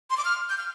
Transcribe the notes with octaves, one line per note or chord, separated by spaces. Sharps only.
C6
D6
F6
G6
F6